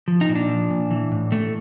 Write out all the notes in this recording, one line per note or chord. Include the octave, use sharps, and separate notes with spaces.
F3
D#4
A#2
D4
F3
A#2
E3
A2
E3 A3